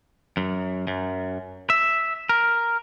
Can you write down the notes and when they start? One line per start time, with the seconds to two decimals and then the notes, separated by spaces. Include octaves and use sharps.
0.37 F#2
0.87 F#2
1.70 E5
2.29 A#4